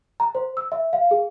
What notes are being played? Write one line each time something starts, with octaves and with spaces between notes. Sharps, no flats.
A#5
C5
E6
E5
F5
G#4